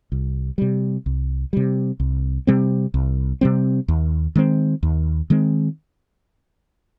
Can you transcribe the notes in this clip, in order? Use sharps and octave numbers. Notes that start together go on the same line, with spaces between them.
C2
C3 G3
C2
C3 G3
C2
C3 G3 C4
C2
C3 G3 C4
D#2
D#3 G#3 C4
D#2
D#3 G#3 C4